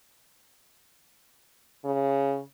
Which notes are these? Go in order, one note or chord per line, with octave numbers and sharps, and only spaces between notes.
C#3